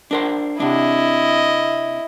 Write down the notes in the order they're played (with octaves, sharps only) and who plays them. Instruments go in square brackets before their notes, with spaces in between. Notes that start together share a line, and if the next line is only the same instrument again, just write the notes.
[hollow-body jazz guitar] D4 A#4 C5
[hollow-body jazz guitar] C3 D4 [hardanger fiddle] E4 D#5